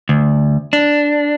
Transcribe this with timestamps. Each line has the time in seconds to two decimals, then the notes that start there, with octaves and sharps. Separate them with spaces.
0.09 D2
0.73 D4